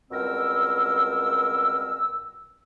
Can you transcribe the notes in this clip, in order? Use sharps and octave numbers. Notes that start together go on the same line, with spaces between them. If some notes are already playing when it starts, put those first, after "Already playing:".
C#2 B2 G3 C4 A#4 E6